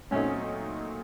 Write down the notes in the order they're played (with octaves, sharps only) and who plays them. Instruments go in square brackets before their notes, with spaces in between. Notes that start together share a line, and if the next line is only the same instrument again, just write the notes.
[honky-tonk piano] A#2 F#3 A3 C4 D#4 [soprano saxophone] C#4